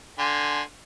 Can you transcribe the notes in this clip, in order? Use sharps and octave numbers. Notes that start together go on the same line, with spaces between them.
D3 G#5 C6